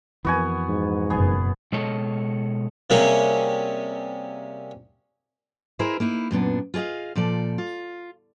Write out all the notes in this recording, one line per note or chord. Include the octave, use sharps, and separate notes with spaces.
F2 E3 B3 F#4 G#5
G#2
F#1 F#2 B2 B3 G#4
B2 G#3 A4 C#5 D#5 A5
C3 G3 A#3 C#4 G#4
E4 G#4 A#4 C5 D#5 E5
A#3 D#4 E4
F#2 A#2 B3 D4
F4 G#4 D5 D#5 F5
A#2 F3 A4 D5
F4